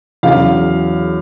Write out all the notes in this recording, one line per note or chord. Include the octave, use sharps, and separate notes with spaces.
E2 C#3 F#3 F5